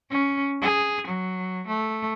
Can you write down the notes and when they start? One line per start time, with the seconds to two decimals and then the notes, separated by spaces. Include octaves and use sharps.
0.10 C#4
0.62 G#4
1.08 F#3
1.67 A3